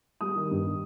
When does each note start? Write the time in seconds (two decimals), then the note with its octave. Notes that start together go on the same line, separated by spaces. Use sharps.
0.21 G3 D#6
0.35 D#3
0.51 G2